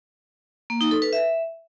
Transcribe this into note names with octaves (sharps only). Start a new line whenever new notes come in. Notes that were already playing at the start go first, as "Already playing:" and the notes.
A#3
D#4
A4
B4
E5